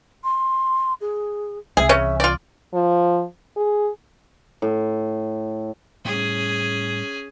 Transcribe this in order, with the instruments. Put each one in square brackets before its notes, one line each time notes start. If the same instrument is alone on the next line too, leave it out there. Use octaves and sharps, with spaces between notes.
[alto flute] C6
G#4
[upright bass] C2 E3 [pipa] G#4 [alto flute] E5
[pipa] C#3 C#4
F4 D5
[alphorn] F3
G#4
[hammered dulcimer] A2
[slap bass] A2 G3 [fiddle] C#4 G#4